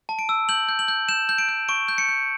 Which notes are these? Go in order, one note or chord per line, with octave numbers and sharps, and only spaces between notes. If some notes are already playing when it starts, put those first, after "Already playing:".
A5
D7
E6
G6 F#7
G6
F#7
G6
G6 E7
G6
D7
G6
C#6 D7
G6
C#7
G6